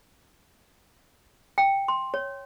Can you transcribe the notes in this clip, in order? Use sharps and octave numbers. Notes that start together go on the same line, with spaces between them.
G5
C6
C#5